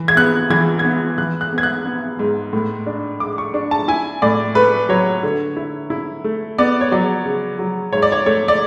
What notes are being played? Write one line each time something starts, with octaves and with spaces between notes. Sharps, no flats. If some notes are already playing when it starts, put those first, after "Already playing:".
Already playing: E3
G#6
B3 F#6
E3 G#6
G#6
B3
E3 F#6
F#6
B3
G#6
F#6
B3
G#2
A2
D4
G#3 D6
C#6
D4
A5
E4 G#5
A2 D5
A3 B4
F#3 C#5
D3
E4
E4
A3
B3 D5
C#5
F#3 D5
C#3
F#3
G#2 C#5
D5
C#5
A3 C#5
D5